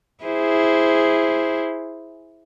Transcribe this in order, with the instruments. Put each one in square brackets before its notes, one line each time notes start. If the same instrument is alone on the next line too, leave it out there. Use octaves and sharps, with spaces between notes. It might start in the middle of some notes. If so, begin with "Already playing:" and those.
[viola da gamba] E4 G#4 C5